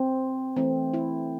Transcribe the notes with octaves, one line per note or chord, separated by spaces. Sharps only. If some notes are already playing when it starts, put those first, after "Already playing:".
Already playing: C4
E3 A3 C4
E4